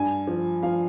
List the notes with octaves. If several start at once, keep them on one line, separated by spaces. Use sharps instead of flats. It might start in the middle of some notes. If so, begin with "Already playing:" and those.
Already playing: G2 G#5
F3
F3 F5